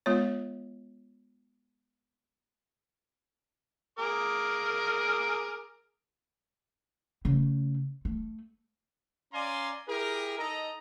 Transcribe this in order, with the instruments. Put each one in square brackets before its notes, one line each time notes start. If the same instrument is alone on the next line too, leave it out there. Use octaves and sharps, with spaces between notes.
[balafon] G#3 B3 F4 C#5
[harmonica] G#4 A#4 D6
[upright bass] C#3 A3
A3
[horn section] C#4 D5 F5 G#5 A#5 C6
E4 G4 G#4 A#4
D#4 A4 D#5 A#5